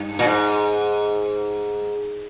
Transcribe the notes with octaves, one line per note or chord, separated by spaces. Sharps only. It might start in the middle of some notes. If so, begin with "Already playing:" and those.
Already playing: G2
A#2
G#2